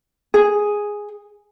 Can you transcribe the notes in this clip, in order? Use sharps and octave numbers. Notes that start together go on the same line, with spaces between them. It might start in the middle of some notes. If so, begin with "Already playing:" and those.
G#4